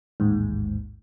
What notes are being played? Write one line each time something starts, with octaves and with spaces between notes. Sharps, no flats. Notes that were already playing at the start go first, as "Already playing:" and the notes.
A1 D#2 G#2